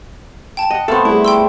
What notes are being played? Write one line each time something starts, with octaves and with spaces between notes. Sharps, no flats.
G5 A5
D#5 F#5
A3 B3 C4 A4 F5
G3 A3 E4 G#4
G5 C6 E6